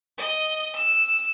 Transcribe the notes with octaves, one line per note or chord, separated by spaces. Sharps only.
D#5
E6